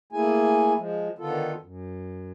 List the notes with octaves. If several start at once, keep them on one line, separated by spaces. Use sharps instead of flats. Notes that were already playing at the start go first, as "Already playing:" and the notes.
A3 A#3 E4 G#4 G#5
F3 G#3
D3 D#3 B3 F4 A4
F#2